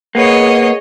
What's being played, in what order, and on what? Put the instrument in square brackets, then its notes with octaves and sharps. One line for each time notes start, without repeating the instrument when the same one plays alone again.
[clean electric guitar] A#3 B3 [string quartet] G#4 C#5 D#5